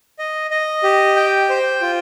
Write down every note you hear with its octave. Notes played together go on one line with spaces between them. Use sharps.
D#5
D#5
G4
G5
C5
F4